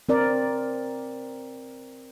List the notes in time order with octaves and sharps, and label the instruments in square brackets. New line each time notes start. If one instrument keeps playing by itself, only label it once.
[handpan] C4 A#4 D5